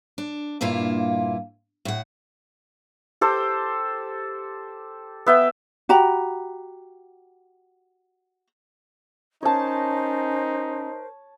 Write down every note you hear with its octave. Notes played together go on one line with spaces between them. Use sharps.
D4
G2 A#2 A#3 E4 F4
A2 F#5
G4 A4 C5
B3 E5 G5
F#4 G4 A#5 B5
C#4 D#4 A#4 C5 C#5 A5